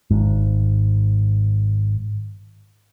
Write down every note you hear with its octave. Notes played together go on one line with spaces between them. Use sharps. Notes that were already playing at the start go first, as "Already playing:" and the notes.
G#1 G#2